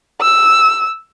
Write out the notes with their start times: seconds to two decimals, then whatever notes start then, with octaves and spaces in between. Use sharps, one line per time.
0.21 E6